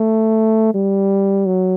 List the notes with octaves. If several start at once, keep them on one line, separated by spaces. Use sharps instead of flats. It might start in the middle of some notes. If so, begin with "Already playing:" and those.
Already playing: A3
G3
F#3